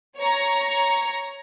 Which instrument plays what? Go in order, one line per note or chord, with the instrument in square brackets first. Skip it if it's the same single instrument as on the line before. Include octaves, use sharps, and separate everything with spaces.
[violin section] C#5 A#5